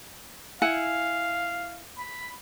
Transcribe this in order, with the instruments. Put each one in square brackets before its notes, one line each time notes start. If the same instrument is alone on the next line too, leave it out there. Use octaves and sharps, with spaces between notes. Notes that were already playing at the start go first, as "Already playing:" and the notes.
[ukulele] E4 F#5 G#5 [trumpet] F5
[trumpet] B5